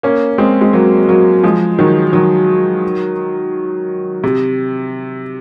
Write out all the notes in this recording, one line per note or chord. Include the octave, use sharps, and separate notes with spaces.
A#3 C#4
G#3 C4
G#3
F#3 A#3
F#3 A#3
F3 G#3
D#3 F#3
D#3 F#3
C3